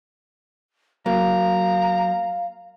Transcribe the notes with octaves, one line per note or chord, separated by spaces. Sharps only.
F#3 A#3 F5 A#5